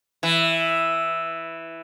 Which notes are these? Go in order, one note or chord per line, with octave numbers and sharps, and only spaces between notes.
E3